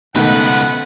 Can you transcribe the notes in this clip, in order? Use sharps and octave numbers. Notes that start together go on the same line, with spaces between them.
C#2 B2 D#3 F3 A3 B3 B4 F#5